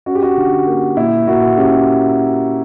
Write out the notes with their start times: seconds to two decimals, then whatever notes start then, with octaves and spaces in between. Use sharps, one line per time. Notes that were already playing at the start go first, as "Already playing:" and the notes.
0.06 C#4 F#4
0.15 G4
0.23 F#4
0.37 D3
0.67 A#3
0.97 A#2 E4
1.27 A#2 F#4
1.57 C#4 G4